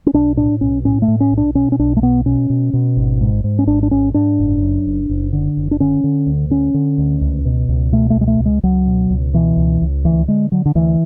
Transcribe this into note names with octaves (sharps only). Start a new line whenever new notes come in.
C#4
B1 D4
A2 D4
B1 C#4
A2 C#4
A3
A2
C#4
B1
D4
B2 C#4
C#4
B1 D4
A3
B2 B3
B2 C#4
B2
B2
G#1
G#2
G#2
C#4
G#1 D4
D4
G#2 C#4
G#2 D4
F#1
F#2
F#1
F#1
D3
F#1
D4
D3 C#4
D3
D2
D3 C#4
D3
D2
C#2
B2
C#2
B2 A3
A3
C#2
G#3
A3
C#2
G#3
C#2 F#3
B2
C#2
B2 E3
C#2
C#2
D2 E3
D3 G#3
D3 F#3
D3
D2 E3